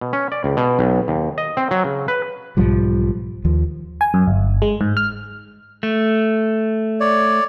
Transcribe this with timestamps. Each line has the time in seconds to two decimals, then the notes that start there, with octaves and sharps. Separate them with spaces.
0.01 B2
0.13 C#4
0.32 D5
0.44 C#2
0.57 B2
0.79 B1
1.08 D#2
1.38 D#5
1.57 C4
1.71 F#3
1.84 C#3
2.08 B4
2.57 B1 G#2 F3 G3
3.45 D#2 F3
4.01 G#5
4.14 F#2
4.27 G1
4.62 G#3
4.81 G#2
4.97 F6
5.83 A3
7.00 C#5 D5